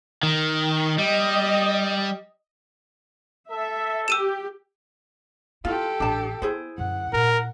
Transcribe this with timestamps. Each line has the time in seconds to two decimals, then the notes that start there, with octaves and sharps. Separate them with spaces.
0.23 D#3
0.99 G3 D#5
3.50 A4 E5
4.08 G4 E6 D#7 E7
5.65 E4 F4 G4 A4
6.00 A1 D4 A5
6.42 B3 E4 G#4 C5
6.78 F#2 D3 F#5
7.13 A#2 A#4